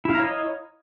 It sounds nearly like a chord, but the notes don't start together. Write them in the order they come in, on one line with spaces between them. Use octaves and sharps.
E4 F5 A#5 C#5 D#5